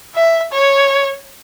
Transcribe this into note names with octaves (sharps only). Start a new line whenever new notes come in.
E5
C#5